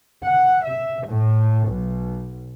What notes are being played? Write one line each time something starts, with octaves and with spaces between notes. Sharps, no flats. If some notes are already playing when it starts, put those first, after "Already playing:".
F#5
E5
A2
B1